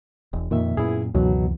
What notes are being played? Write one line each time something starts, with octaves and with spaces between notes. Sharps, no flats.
E1
F2 A#2 D#3 E5
F#2 A#2 B3 E4 G#4
C#2 F#2 B2 D#3 E3 F#3